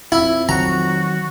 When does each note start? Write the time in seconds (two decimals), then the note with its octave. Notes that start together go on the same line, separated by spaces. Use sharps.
0.12 F2 E4
0.49 D#3 F#3 F#4 A#5